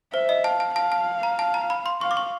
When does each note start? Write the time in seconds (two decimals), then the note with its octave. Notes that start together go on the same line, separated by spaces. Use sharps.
0.13 C5 E5
0.29 D#5
0.44 F5 A5
0.60 A5
0.75 F5 A5
0.92 A5
1.23 A#5
1.39 A5
1.54 A#5
1.70 B5
1.86 C6
2.01 F5 C#6
2.11 D6
2.17 C#6